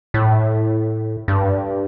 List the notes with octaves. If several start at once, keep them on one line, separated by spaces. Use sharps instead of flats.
A2
G2